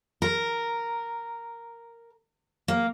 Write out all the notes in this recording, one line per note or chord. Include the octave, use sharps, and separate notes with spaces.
A#4
A#3